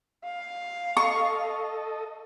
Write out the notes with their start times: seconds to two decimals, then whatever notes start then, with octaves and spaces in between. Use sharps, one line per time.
0.25 F5
0.97 A4 D#5 C#6